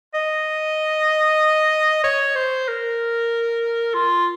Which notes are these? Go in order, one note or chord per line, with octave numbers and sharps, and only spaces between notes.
D#5
C#5
C5
A#4
F4